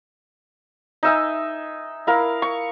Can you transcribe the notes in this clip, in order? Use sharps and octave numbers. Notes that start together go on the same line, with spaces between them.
D#4 E5 G#5
E4 A#4 F5
C#6